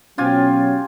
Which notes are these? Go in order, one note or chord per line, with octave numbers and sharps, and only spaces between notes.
B2 F#3 C#4 F4 G4 G#5